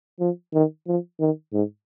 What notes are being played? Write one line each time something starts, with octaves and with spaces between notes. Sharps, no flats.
F3
D#3
F3
D#3
G#2